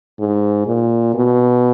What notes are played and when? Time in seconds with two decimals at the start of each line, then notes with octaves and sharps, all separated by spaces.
0.19 G#2
0.67 A#2
1.14 B2